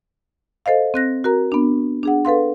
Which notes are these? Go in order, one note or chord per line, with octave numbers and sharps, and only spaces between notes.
A4 C5 D#5 F5
C4 F#6 A#6
F#4 A#4 A#5
B3 D4
D4 G#4 F#5
A4 B4 F5 C6